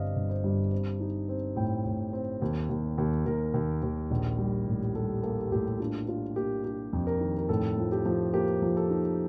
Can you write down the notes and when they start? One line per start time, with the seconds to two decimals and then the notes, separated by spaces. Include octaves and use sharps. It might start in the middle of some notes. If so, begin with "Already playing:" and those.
Already playing: G1 G2 C4 D5 D#5 F5
0.16 G1
0.30 C5
0.44 G2
0.72 C4
1.00 D#4
1.29 C4
1.56 A2 G5
1.85 A2
2.13 C4
2.42 D#2
2.70 D#2
2.98 D#2
3.26 D#2 A#4
3.54 D#2
3.83 D#2
4.11 A#1
4.39 G3
4.67 A2
4.95 G3 A4
5.23 A#3 A4
5.52 A2 G4
5.80 D4 F4
6.08 D4 F4
6.36 A#3 G4
6.65 D4 G4
6.93 F2
7.07 A#4
7.21 D#3
7.38 A#4
7.49 A2 A4
7.78 F3
7.92 G4
8.05 F3
8.34 A#3 G4
8.62 F3
8.77 A4
8.90 D#4